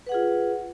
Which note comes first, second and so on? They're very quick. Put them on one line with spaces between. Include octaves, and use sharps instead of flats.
B4 F#5 G#4 F4